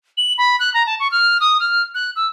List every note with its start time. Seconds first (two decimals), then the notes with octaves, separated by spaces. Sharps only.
0.17 F#7
0.38 B5
0.59 F#6
0.74 A#5
0.86 A5
1.00 C#6
1.11 F6
1.40 D#6
1.60 F6
1.94 F#6
2.16 E6